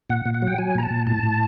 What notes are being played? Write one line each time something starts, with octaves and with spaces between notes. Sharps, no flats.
A#2 F#5
A#2
F#5
F#3 G5
F#3 G#5
A#2 A#5
A5
A#2
A2 A5
A2